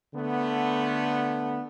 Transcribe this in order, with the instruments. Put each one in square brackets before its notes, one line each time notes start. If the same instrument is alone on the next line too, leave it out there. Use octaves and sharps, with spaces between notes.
[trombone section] D3 A3 B3